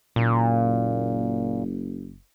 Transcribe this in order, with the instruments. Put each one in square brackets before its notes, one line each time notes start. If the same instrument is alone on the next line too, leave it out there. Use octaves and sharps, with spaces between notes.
[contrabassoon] F#1 [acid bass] A#2